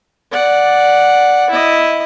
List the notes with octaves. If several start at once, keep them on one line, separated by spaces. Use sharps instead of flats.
D5 F#5
E4 D#5